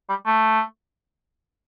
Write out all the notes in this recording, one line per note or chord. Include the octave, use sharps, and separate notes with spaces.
G3
A3